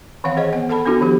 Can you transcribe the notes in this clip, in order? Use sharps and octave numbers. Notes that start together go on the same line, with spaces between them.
D#3 E3 C4 C#5 F5 F#5
G#4 C5 C#5 D#5 F#5
B3 F#5
A4 F#5 A5 B5
B3 D4 E4 F#4 A4
D#3 F3 B3 G4